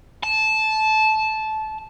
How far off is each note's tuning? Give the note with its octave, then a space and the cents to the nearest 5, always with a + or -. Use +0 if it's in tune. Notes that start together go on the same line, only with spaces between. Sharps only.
A5 -15